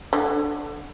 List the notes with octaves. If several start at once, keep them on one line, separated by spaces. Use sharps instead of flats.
D3